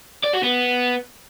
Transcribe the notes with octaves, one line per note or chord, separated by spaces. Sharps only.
D5
F#4
B3